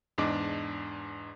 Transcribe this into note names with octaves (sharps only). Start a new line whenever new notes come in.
E2 G#2 D4 D#5 D6